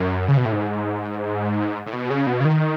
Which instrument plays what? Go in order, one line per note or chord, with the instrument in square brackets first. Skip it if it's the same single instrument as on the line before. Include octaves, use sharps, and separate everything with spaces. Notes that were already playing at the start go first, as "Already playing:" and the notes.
Already playing: [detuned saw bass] F#2
C#3
B2
A2
G#2
A2
B2
C#3
B2
C#3
D#3